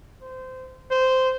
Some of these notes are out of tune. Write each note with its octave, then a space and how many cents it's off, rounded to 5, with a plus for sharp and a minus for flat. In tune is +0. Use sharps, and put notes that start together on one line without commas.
C5 -20
C5 -10